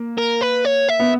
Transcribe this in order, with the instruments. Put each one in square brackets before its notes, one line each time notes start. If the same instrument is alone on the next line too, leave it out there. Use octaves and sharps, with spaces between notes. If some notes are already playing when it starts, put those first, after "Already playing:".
Already playing: [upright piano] A#3
[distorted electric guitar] A#4
B4
C#5
E5
[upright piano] B3